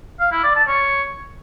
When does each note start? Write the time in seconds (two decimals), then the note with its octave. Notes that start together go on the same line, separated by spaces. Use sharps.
0.20 F5
0.32 E4
0.44 D5
0.56 A5
0.68 C#5